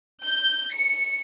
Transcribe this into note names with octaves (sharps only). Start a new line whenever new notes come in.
G6
C#7